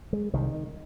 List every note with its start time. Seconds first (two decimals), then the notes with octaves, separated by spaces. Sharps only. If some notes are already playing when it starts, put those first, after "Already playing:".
0.13 G#3
0.33 C2 D#3